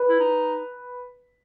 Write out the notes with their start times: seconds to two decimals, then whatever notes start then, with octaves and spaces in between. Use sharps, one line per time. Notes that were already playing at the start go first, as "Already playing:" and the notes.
Already playing: B4
0.09 E4
0.20 D#4